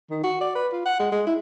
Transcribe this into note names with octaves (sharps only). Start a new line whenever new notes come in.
D#3
F#4
D5
B4
F4
F#5
G#3
G#3
E4